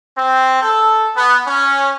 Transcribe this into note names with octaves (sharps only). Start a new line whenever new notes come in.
C4
A4
B3
C#4